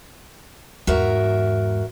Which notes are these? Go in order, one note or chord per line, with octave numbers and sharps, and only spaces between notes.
E2 G#2 F#4 A#4 E5